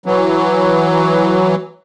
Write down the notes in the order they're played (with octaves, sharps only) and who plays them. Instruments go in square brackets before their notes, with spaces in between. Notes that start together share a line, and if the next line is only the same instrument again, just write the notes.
[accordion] E3 F#3